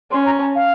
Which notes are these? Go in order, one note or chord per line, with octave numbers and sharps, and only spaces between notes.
C#4 C6
A#5
A5
F5